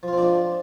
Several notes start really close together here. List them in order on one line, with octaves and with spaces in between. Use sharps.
F3 F4 C4 D4 G#3